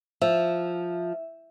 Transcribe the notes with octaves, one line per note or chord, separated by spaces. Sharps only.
F3 E5